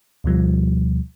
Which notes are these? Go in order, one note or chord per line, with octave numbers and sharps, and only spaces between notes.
D2 B2 F3 G3